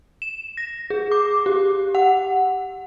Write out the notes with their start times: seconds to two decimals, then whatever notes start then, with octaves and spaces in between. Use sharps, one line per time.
0.22 E7
0.57 A#6
0.90 G#4
1.12 D6
1.46 G4
1.95 F#5